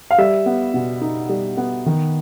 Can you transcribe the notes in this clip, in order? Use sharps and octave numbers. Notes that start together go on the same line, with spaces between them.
F5
G3 E5
B3
B2
D#4
G3
B3
D#3